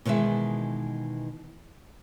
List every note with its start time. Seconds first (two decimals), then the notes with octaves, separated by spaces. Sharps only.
0.05 B2 D#3 E3 G#3 E5